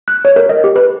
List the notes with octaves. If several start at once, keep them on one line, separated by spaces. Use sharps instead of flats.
F#6
C#5
A#4
D#5
G4
B4